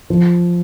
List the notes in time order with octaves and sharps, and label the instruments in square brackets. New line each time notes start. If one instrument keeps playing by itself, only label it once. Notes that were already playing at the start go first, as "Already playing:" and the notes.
[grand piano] F3